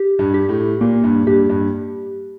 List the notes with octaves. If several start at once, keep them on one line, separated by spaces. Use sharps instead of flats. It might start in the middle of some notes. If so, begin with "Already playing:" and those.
Already playing: G4
G2
G4
A2
A#2 A#3
G2
G2 G4
G2